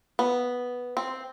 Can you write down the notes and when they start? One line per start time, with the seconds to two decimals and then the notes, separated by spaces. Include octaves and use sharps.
0.19 B3
0.97 C4